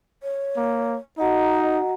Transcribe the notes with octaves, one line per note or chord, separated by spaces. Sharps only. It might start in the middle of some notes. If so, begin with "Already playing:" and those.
C#5
A#3
D#4 F#4 D#5 F#5 A#5